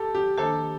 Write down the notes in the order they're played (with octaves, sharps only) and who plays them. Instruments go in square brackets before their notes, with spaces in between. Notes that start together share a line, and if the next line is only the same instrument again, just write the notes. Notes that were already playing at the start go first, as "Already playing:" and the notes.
Already playing: [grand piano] G4 A4
G4
[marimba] D#3 A#3 D4 G4 C5 [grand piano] A4